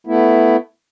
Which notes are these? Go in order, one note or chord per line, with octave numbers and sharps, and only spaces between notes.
A3 B3 E4